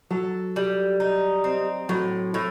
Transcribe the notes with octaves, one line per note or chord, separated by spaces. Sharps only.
F#3 A4
G3
D#4
C4
A2 F#3
A2